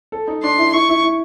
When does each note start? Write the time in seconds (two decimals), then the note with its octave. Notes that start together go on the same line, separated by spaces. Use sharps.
0.12 A4
0.28 D#4
0.43 D4 C6
0.58 E4
0.73 E4 C#6
0.89 E4
1.03 E4